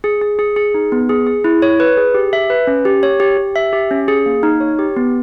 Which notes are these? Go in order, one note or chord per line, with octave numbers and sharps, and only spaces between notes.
G#4
G#4
G#4
G#4
D#4
B3
G#4
G#4
E4
C#5
B4
G#4
G4
E5
B4
C#4
G4
C#5
G4
G4
E5
G4
C#4
G#4
A#3
D#4
C#5
G4
B3